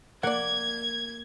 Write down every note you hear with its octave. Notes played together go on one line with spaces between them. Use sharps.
A#3 D5 F#5 G#6